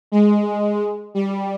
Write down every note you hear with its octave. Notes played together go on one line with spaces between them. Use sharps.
G#3
G3